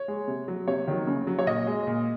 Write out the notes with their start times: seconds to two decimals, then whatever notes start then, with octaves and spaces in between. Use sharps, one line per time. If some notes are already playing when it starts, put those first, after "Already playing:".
Already playing: C#5
0.08 G#3
0.28 C3
0.48 F#3
0.67 C3 C#5
0.88 D#3 F#3
1.07 C#3
1.27 F#3
1.39 C#5
1.47 A#2 D#5
1.67 G#3
1.87 A#2